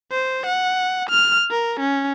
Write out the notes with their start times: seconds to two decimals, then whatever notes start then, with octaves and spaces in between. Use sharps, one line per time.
0.11 C5
0.46 F#5
1.09 F6
1.51 A#4
1.80 C#4